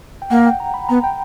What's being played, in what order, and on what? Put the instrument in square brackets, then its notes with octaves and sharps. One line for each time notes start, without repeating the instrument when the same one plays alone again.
[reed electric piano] G5
[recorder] A#3 [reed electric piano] F#5
[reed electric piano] G5
A#5
B5
[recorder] B3 [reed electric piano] A#5
[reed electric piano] G5